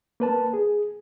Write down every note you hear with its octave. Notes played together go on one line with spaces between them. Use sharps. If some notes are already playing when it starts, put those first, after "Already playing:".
A#3 B4 A5
G#4